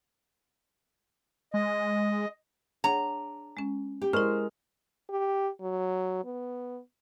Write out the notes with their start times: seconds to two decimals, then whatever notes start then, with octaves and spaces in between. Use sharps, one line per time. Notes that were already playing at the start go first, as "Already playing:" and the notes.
1.54 G#3 D#5
2.84 D4 G#4 C#5 F#5 A#5
3.57 G#3 C#4
4.02 G4
4.13 G#3 E4 A#4 C5 C#6 F6
5.10 G4
5.61 F#3
6.25 B3